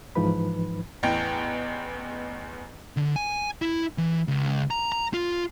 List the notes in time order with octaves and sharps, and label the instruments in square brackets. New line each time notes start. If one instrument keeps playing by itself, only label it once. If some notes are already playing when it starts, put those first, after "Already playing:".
[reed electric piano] G#2 E3 F3 D#4 B4 B5
[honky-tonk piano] A1 E2 G5
[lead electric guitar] D3
G#5
E4
E3
C#2
A#5
A#5
F4